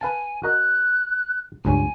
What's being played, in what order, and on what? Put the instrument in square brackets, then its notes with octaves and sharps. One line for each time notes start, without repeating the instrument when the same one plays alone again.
[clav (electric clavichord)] B4 F5 A5 [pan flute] G#5
[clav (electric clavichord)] F#4 A#4 D#5 [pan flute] F#6
[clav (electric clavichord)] C#2 G2 C#4 [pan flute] G#5